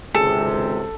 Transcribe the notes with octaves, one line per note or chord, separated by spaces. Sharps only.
G#1 C#2 C3 G#4 A4